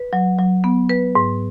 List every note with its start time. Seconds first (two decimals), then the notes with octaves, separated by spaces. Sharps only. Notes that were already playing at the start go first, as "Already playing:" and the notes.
Already playing: B4
0.13 F#3
0.39 F#3
0.64 B3
0.89 B4
1.15 G#2